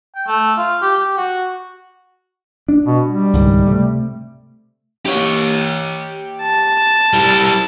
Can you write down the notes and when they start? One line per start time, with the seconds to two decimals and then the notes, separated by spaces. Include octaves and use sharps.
0.15 G5
0.27 A3
0.58 F4
0.82 G4
0.97 G4
1.17 F#4
2.69 D4
2.86 B2
3.07 G3
3.33 C#2 G#2 D#3
3.67 C3 A3
5.06 G4 C#5
6.43 A5
7.14 G3 E4